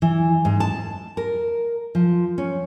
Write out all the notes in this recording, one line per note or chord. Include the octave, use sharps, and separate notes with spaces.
E3
G#2
A5
A#4
F3
C#4